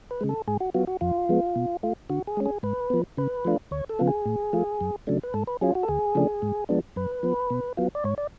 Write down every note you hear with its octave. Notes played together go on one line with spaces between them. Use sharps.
B4
C#3 G#3
A4
G#2 G#4
F#4
F#3 B3 F4 F#4
F#4
F2 F4
F3 G#3 B3
B2
A3 F4
D3 F#4
G#4
G#3 C#4
G#4
G#2 B4
F3 B3
C#3 B4
F3 A3 D4 F4
D2 C#5
A4
C#3 F3 B3 F4
G#4
A2
F3 A3 F4
F#2
C#3 F#3 A3 D4
B4
G#2 A4
B4
F#3 C#4 F4 G#4
F#4
A4
D2 G#4
C#3 F3 A3 D4
G#2
F3 G#3 B3 D4
F#2 B4
F3 B3
B2
F#3 B3 F4
D5
G#2 C#5
D5